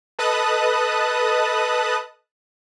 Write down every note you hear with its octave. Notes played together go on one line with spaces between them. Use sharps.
A4 B4 D#5 A5 D#6 F#6